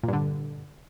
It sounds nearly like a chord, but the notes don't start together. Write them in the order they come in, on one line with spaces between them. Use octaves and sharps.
A#2 G2 D3